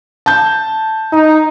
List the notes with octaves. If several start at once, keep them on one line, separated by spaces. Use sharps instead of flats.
A5 G6
D#4